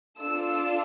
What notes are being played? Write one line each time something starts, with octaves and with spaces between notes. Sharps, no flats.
D4 F4 A4 E6